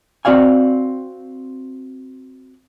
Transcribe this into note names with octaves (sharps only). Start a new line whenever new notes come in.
C4 F#4 D5 F5 G#5